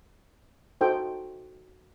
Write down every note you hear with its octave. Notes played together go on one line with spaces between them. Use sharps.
D#4 F#4 A4 C5 G5